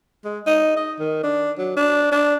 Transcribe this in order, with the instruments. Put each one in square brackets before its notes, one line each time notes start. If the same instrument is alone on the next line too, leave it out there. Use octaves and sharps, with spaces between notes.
[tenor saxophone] G#3
D#4
D#5
D#3
D4
F#3
D4
D4